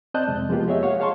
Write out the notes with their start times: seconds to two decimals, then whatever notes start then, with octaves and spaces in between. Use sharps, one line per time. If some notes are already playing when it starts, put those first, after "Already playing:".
0.14 C4 D5 D#5 A5 F#6 G6
0.28 F2 C3 G#3
0.49 F3 G#3 A#3 B3 F4 G4
0.68 G4 G#4 C#5 D#5 E5
0.83 C#5 F5 F#5
1.00 G#4 C#5 F5 A5 C6 C#6